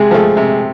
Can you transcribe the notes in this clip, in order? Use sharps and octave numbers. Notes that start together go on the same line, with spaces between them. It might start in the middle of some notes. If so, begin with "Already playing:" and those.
Already playing: C3 G#3 G#4
F3 A3
C3